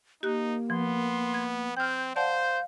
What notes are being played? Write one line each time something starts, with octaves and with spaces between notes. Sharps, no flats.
A#3 D#4 G4 F#6
F3 B3 C6
G#6
C4 G5 F6 G6
C5 D5 F5 F#5 A5 G6